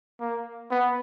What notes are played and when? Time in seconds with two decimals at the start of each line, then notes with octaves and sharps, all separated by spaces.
0.20 A#3
0.71 B3